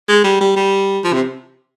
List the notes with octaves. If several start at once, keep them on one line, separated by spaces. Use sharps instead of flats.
G#3
G3
G3
G3
F3
C3